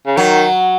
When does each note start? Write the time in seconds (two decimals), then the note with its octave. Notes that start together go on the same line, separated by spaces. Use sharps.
0.06 C#3
0.17 D#3 F#3